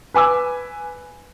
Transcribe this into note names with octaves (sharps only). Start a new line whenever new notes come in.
B4 G#5 D6 E6